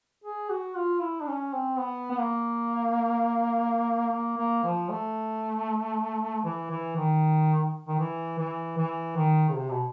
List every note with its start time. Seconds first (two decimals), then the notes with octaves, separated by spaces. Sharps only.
0.24 G#4
0.50 F#4
0.76 F4
1.02 E4
1.21 D4
1.27 C#4
1.53 C4
1.79 B3
2.11 B3
2.18 A#3
4.12 A#3
4.38 A#3
4.64 F3
4.90 A3
6.44 E3
6.70 E3
6.97 D#3
7.89 D#3
8.00 E3
8.38 E3
8.77 E3
9.16 D#3
9.49 C#3
9.55 C3
9.70 B2